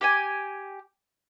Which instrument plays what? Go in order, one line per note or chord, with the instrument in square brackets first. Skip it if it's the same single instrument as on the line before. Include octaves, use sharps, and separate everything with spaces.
[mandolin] G4 G5 G#5